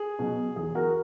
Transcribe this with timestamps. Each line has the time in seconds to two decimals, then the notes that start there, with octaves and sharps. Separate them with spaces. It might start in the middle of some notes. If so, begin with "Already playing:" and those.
Already playing: G#4
0.19 B2 F#3
0.56 E2 G#4
0.75 F#4 A#4